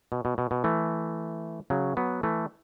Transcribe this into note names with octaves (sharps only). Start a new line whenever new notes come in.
B2
B2
B2
B2
E3 A3
C#3 F#3
F#3 B3
E3 A3